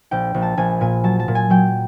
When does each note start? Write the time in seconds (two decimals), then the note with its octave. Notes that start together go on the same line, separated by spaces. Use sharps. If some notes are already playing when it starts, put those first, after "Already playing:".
0.11 A#1 G5
0.34 A#1
0.42 A5
0.57 A#1 G#5
0.81 A#2 G#5
1.04 F#3 A5
1.20 A5
1.28 A#2
1.35 G#5
1.50 F#3 G5